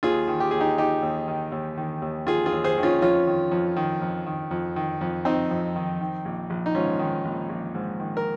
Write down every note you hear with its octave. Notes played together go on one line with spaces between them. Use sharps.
D#2 F4 G#4
D#3
G4
D#2 G#4
D#4 G4
D#3 D#4 G4
D#2
D#3
D#2
D#3
D#2
D#3 F4 G#4
F4 G#4
D#2
G#4 C5
D#3
C#4 F4
F2 C#4 F4
D#3
F2
D#3
F2
D#3
F2
D#3
F2
D#3 C4 D#4
F2
D#3
D#3
A#1
A#1
D#4
G#2 C#4 F4
D#3
A#1
A#1
G#2
D#3
A#4